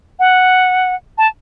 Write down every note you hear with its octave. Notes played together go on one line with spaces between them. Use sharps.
F#5
A5